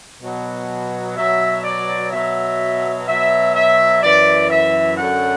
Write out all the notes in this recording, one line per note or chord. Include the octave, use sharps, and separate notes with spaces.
B2 F#3
B2 F#3 E5
D5
B2 F#3 E5
B2 F#3 E5
E5
F#2 E3 D5
E5
F#2 D3 F#3 F#5